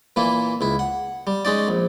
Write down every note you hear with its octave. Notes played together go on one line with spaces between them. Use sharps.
A#2 E3 A#3 E4
C#2 E4
F#5
G3
G#3 C#4 D#4 D5
A#1